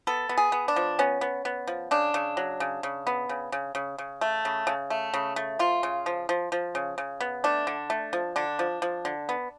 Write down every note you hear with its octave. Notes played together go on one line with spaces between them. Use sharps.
B3 A4
B3
G#4
B3
D4
F3
B3 C#4
B3
B3
F3
C#3 D4
C#3
F#3
C#3
C#3
B3
C#3
C#3
C#3
C#3
A3
C#3
C#3
A3
C#3
A3
F3 F4
C#3
F3
F3
F3
C#3
C#3
B3
A3 D4
D3
A3
F3
D3 D4
F3
F3
D3
B3